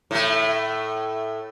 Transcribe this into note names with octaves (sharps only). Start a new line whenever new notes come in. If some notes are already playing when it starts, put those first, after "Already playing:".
A2 A3